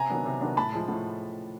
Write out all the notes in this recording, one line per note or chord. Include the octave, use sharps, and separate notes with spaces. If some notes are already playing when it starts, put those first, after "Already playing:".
Already playing: C3 G#5 A#5
D#3 F#3 B3 D4
C3
D#3 F#3 B3 D4
A2 A5 B5
F3 G#3
A2